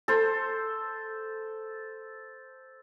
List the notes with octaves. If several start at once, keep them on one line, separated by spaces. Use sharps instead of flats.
A4 C5